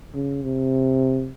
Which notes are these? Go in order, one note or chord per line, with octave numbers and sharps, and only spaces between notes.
C#3
C3